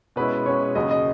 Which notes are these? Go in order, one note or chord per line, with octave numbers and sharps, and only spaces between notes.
B2 G#3 C#4 E4 B4
B2 G#3 C#4 E4 C#5
D#2 C#3 F#3 D#5
D#5